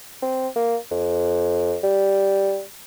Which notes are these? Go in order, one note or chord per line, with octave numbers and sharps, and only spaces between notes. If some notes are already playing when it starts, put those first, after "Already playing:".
C4
A#3
F2
G3